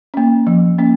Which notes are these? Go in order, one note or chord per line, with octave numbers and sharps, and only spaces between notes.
A#3 C#4
F3
A#3 C#4